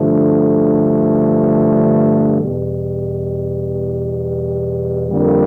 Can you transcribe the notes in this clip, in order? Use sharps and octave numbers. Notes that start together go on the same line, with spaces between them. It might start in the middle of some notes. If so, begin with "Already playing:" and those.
Already playing: G2 D3 F3 A3
E2 B2 G3
F2 D3 G3 A#3